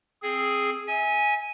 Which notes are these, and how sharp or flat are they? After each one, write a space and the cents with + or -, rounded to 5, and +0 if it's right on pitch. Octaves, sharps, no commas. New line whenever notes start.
C4 +10 G#4 +0
E5 -35 G#5 +0